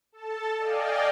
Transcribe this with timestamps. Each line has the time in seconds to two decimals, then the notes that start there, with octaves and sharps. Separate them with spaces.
0.12 A4 A5
0.58 D5 D#5 F5 G5 G#5